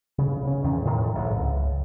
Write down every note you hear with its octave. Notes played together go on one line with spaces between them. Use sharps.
C#3
C#3 B3 C#4
E2 D#3
A2 D#3 F3
A1 D2 G#2 F#3
C#2